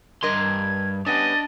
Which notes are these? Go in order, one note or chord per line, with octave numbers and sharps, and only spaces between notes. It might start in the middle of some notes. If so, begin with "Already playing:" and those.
G2 D4 A#4 D#5 C6 G#6
G3 B3 C#4 D4 D#5 A6